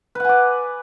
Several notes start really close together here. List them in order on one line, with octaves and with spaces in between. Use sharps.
B4 F#5 G#5 D5